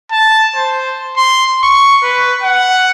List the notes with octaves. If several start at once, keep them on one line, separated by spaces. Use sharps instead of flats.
A5
C5
C6
C#6
B4
F#5